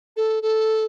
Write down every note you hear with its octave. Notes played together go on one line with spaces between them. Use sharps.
A4
A4